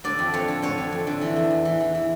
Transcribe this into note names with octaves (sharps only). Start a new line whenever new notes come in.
D3 D5
F2
F2 C#5
D3
D3 C#5
F2
F2
D3
E3
E2
E2
E3
E3
E3